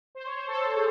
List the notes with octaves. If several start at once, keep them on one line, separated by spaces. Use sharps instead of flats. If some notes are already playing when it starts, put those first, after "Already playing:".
C5
C#5
C5
A4
C5
G#4